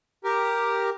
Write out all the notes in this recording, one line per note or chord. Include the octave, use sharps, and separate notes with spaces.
G4 A#4